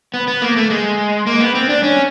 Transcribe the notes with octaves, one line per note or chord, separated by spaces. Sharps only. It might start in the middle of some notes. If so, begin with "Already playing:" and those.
B3
B3
A#3
A3
G#3
A#3
B3
C4
D4
C#4